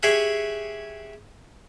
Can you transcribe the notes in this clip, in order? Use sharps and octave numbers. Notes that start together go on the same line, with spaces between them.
G4 G#4 C#5 E5 F#5 G#5